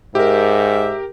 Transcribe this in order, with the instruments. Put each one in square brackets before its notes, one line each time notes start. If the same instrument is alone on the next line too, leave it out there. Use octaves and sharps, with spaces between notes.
[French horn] G#2 [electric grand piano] G4 A#4 [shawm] E5